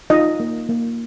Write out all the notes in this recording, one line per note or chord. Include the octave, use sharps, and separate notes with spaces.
D#4 F4 D#5
A#3
A#3